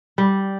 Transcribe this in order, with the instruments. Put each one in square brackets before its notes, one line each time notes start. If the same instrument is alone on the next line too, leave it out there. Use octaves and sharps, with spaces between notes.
[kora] G3